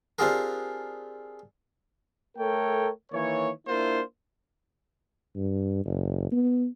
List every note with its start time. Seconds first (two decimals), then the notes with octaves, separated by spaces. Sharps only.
0.19 C4 D4 F4 G4 G#4 A#4
2.38 A3 A4 A#4 C#5 G5
3.12 D#3 E3 A#3 C#5
3.67 A#3 D4 E4 F4 C5
5.36 G2
5.85 F#1
6.32 B3